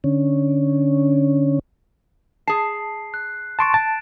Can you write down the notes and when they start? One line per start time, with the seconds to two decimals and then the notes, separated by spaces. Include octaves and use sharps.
0.04 D3 C#4
2.47 G#4 A5 C7
3.14 F#6
3.59 A5 C6 C#6 A6 D7 E7
3.74 A5